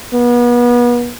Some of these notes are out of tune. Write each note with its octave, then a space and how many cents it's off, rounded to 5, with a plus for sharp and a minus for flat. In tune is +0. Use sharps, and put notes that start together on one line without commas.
B3 -35